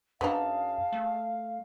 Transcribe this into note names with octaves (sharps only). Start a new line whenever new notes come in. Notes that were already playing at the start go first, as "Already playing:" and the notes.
F#2 B3 D4 D#4 G#4 F5 A5
A3